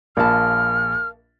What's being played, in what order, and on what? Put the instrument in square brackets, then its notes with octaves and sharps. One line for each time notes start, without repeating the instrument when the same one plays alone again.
[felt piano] A#1 B5 [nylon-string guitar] A#4 F5 A5 [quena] F6